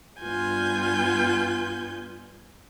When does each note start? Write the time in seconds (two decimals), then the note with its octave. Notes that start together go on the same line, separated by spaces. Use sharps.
0.21 G2 B3 F4 G#5 G6